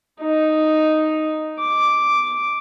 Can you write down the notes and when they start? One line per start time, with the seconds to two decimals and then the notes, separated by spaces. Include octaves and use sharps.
0.21 D#4
1.60 D6